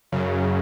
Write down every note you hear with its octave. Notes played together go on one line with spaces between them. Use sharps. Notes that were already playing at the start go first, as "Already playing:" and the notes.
F#2 C#3 F#3